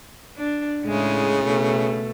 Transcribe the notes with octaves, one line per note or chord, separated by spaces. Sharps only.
D4
A2 C#3 G#3 E4
B2 A3